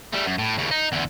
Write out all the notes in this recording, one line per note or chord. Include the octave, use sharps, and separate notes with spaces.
G3 A3
F#2
A2
D#2 C#3
D#4
E2 D3